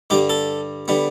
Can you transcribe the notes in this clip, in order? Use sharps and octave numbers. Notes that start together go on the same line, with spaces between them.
G2 D3 G3 G4
A4
D3 G3 B3